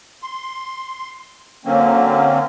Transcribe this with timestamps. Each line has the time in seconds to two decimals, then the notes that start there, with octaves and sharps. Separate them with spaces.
0.22 C6
1.65 D3 F#3 A#3 C4 C#4